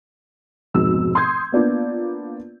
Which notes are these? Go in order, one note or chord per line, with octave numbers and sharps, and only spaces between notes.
F1 G#2 B2 E6
C6 D#6 G6 G#6
A#3 B3 D4 F4